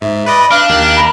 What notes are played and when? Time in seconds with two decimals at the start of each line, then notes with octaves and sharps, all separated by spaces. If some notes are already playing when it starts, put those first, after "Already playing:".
0.01 G#2 E5
0.26 B4 D5 D#5 B5
0.51 D4 F5 D6 F6 F#6
0.69 D#2 D#3 F#6
0.96 A#5 B5